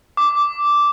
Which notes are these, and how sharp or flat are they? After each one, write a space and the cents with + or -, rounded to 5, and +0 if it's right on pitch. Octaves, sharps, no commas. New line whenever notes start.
D6 -5